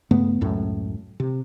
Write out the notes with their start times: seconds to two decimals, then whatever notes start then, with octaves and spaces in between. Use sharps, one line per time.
0.11 G2 C#3 A3 B3
0.41 C#2 F#2 A2
1.20 C3